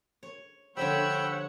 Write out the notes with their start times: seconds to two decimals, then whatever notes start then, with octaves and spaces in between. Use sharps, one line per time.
0.23 C#5
0.77 D3 F3 G3 C#5 F#5 G5 B5 E6